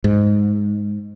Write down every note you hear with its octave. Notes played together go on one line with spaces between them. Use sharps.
G#2